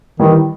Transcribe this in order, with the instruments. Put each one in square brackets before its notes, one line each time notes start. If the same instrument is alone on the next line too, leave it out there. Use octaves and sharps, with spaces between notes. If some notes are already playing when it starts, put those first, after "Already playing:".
[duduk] D#3 [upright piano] E3 G3